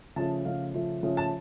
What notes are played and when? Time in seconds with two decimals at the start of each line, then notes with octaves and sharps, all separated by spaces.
0.16 C#3 F3 A3 A5
0.45 C#3 F3 A3 F5
0.74 C#3 F3 A3
1.03 C#3 F3 A3
1.17 A5